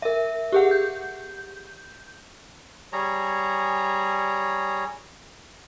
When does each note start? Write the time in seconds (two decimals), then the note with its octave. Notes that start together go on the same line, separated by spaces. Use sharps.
0.02 A#4 E5
0.53 G4 G#4 F#5
0.71 G6
2.93 G3 G#4 C#5 A#5